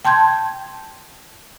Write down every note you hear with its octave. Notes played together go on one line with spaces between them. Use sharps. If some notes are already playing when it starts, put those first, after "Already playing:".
G5 A5 C6 G6 G#6